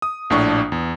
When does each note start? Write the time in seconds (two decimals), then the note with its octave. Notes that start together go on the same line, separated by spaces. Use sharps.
0.02 D#6
0.30 A#1 A2 D4 C#6
0.72 E2